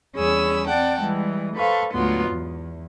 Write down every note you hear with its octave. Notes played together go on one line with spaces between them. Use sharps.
E2 G3 C#4 G#4 B5 E6
C4 D5 F#5 G5 A5
E3 G3 G#3
A4 B4 C5 F5 A5 C#6
D2 G#2 F#3 B3 F4 C6
E2